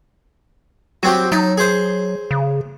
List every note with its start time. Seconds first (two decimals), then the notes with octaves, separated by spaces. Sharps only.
1.03 F#3 C4 F#4 G4
1.32 F#3 D#4 A5
1.58 G#4 C5
2.31 C#3